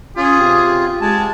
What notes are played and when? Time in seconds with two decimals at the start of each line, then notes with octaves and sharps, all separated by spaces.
0.16 C#4 F4 G#4
0.40 C3 G4
1.01 G#3 G#5 A5